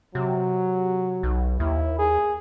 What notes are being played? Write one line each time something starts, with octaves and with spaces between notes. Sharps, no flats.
C3 F#3
B1
D#2 E4
G#4